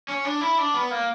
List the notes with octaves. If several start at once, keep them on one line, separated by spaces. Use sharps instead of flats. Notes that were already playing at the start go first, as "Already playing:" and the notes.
C#4
D4
E4
D4
B3
A#3